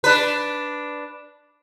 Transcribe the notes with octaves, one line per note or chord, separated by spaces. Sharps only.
D4 B4